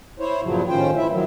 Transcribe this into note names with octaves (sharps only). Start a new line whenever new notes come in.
E4 C5 C#5
G2 A#2 C#3 F3 F#3
A2 D#3 C#4 F4 C5 G5
E3 E4 E5
D#3 F3 F#3